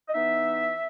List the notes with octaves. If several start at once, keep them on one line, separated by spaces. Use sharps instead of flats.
D#5
E3 B3 D#4 E5